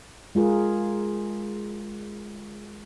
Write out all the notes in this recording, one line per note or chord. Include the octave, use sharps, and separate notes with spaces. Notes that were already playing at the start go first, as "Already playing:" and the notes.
G#3 F4 G#4 A#4